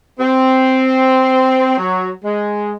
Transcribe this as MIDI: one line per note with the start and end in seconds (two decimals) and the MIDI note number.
0.20 1.75 60
1.78 2.10 54
2.25 2.73 56